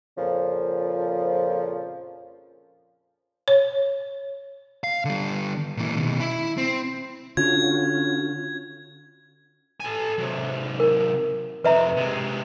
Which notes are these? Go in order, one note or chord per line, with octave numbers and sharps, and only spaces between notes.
F2 A#2 C#3 F3
C#5
F5
D3 G3
A#2 E3
B2 D#3
E4
C4
D3 C#4 F4 F#4 G#6
A4 G#5
C3 F#3
A#4
F2 C3 B4 E5 A#5
C3 G#3